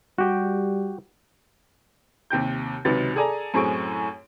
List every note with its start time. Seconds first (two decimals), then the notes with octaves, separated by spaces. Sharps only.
0.18 G3 F#4 G4 G5
2.30 D#2 C3 G5 G6
2.85 C#2 C3 D#3 F#3 B4 A6
3.16 G#4 A4 D5 G#5 A#5
3.54 F#2 A2 C4 G#4 C#6 D7